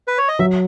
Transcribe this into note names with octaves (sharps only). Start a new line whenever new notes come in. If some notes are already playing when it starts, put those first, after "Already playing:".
B4
C#5
D#5
F#3 E5